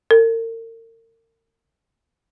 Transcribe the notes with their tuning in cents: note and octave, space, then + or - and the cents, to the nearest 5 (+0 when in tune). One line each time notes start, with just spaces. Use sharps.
A#4 -40